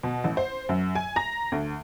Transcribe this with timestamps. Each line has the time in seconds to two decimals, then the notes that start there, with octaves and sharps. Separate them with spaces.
0.03 B2
0.24 A1
0.37 C5
0.69 F#2
0.95 G#5
1.16 A#5
1.52 D2